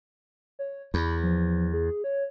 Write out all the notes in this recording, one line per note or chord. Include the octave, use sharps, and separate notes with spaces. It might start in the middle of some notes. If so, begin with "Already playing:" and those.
C#5
E2 B5
F3
G#4
C#5